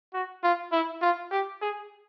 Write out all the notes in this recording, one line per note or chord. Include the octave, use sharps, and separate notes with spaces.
F#4
F4
E4
F4
G4
G#4